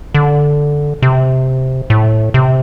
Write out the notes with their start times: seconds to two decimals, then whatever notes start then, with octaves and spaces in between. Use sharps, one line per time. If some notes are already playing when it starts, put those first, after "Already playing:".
0.14 D3
1.03 C3
1.90 A2
2.34 C3